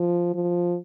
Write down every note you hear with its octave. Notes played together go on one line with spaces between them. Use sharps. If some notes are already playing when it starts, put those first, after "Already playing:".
Already playing: F3
F3